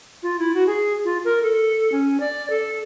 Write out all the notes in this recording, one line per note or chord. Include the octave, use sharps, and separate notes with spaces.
F4
E4
F#4
G#4
F4
A#4
A4
C#4
D5
A4